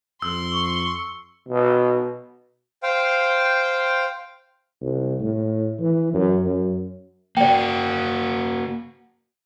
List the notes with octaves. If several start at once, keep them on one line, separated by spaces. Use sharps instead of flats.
F2 C6 E6
C#6
B2
C5 F5 G5
C2
A2
E3
F#2
F#2
A#3 F#4 D5 G5